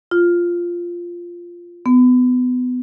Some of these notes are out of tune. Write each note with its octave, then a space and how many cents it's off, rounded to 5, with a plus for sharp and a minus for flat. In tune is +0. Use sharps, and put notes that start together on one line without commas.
F4 -5
B3 +25